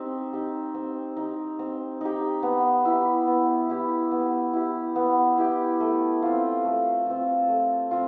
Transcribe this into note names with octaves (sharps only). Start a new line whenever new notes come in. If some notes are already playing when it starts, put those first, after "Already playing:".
Already playing: C4 D#4 G4
D#4 G4
C4
D#4 G4
C4
D#4 G4
B3
E4 G4
B3
E4 G4
B3
E4 G4
B3
E4 G4
A3
C4 F4
A3
C4 F4
A3
C4 F4